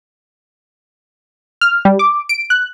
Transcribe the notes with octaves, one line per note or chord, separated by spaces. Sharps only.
F6
G3
D6
D7
F#6